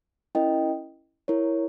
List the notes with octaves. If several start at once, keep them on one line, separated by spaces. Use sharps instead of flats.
C#4 E4 A#4 D#5 G5
E4 A#4 C#5